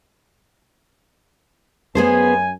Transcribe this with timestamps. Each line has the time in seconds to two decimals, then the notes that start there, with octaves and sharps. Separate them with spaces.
1.95 F#2 B3 G#4 C5 G#5